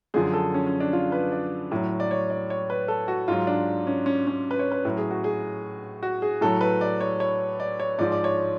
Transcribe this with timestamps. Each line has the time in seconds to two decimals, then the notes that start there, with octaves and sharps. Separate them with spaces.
0.14 F#2 D3 F3 G#4
0.33 A4
0.54 C#4
0.67 C#4
0.80 D4
0.93 F4
1.12 B4
1.32 D5
1.71 A2 F#3
2.00 D5
2.11 C#5
2.30 D5
2.50 C#5
2.70 B4
2.88 A4
3.08 F#4
3.28 G#2 F#3 F4
3.47 D4
3.87 C#4
4.06 C#4
4.27 C#4
4.51 B4
4.59 C#5
4.72 B4
4.85 A2 F#3
4.97 G#4
5.11 F#4
5.24 G#4
6.03 F#4
6.22 G#4
6.41 A2 F#3 A4
6.61 B4
6.81 D5
7.01 C#5
7.20 C#5
7.60 D5
7.80 C#5
7.98 G#2 F3 D5
8.12 D5
8.24 C#5